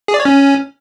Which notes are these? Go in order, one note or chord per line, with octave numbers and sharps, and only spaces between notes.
G#4
D5
C#5
C#4